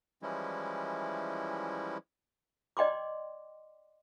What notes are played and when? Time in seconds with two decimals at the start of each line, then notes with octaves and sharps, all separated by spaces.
0.22 E3 F3 G3 G#3 C#4 E4
2.77 D5 D#5 G5 C6 D6